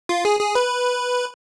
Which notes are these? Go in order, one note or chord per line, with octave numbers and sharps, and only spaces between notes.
F4
G#4
G#4
B4